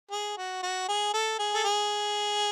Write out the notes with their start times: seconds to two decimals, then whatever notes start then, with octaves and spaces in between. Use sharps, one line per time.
0.12 G#4
0.38 F#4
0.63 F#4
0.89 G#4
1.14 A4
1.39 G#4
1.54 A4
1.64 G#4